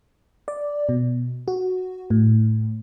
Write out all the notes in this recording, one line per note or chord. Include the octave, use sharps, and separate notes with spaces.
D5
B2
F#4
A2